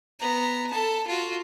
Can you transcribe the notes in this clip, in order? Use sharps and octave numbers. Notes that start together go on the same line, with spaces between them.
B3 A#5
A4 A5
F4 F#4